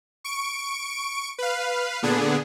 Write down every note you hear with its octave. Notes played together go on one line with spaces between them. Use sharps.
C#6 D7
B4 F5
A#2 D3 B3 D4 G#4